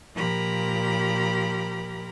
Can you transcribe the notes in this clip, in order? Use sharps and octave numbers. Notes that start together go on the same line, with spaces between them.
A#2 F3 G4 A#4 A#5 B5